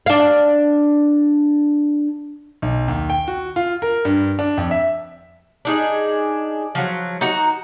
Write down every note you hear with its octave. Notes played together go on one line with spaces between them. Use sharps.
D4 F5
B1
D#2
G5
F#4
F4
A#4
G2
D4
F2
E5
D4 D#4 G#4
F3 F#3
D#4 F#4 A#5